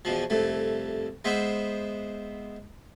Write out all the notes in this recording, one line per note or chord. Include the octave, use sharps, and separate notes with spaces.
E2 B2 F3
C2 F2 A3
G#3 B3 C5 E5